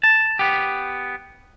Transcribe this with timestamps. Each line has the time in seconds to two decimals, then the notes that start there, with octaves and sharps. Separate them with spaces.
0.03 A5
0.39 B3 G4